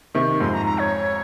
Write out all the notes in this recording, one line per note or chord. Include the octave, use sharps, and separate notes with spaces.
C3 D#3 C#6
F2 G#2 C6
A#5
A#5
C#5